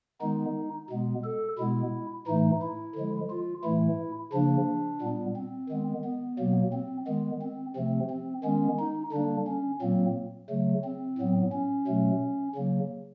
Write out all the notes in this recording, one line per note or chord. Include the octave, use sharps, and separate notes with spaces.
D#3 G#3 B3 D#4
B2 G#3 B3
A4
B2 G#3 B3 E4
A2 E3 A3 D#4
E4
D3 F3 G#3
F4
A2 E3 A3 E4
C#3 F3 A#3 D4
A#2 G3 B3
C4
D#3 G#3 B3
B3
B2 F#3 A#3
C4
D#3 G#3 B3
C4
C3 F3 A3 C4
C4
D#3 G#3 B3 C#4
D#4
D3 G3 A#3 D4
C#4
A#2 F#3 A#3 C4
C#3 F#3 A3
C4
A2 F#3 B3
C#4
B2 F#3 A3
C#3 F#3 A#3